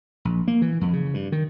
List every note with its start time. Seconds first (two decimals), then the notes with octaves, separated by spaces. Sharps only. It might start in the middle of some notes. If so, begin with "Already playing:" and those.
0.25 A#1
0.48 A#3
0.62 E3
0.81 F2
0.93 C#3
1.14 G2
1.32 D#3